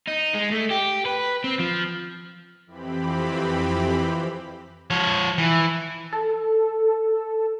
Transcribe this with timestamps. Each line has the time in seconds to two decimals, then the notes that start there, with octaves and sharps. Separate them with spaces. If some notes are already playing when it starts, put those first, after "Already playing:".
0.08 D#4
0.35 G#3
0.51 A3
0.71 G4
1.06 B4
1.44 C4
1.59 F3
2.67 F2 E3 C4 G4 B5
4.90 F3 C#5
5.38 E3
6.13 A4